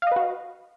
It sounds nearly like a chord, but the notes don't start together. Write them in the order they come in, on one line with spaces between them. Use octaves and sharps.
F5 D#5 B4 F#4